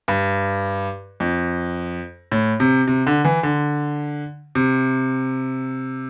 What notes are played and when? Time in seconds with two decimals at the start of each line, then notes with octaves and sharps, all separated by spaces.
0.08 G2
1.20 F2
2.32 A2
2.60 C3
2.88 C3
3.07 D3
3.25 E3
3.43 D3
4.55 C3